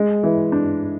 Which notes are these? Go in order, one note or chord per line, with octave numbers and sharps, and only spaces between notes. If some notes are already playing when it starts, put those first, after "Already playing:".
Already playing: G#3
E3
D4